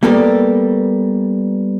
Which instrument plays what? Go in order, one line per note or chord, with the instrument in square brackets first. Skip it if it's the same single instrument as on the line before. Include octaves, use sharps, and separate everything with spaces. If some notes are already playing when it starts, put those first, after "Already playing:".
[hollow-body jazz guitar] G3 A#3 B3 A4 A#4 D5